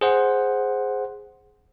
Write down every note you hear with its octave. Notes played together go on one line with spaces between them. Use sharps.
G#4 C5 F#5